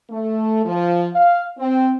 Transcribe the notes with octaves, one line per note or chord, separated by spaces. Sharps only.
A3
F3
F5
C4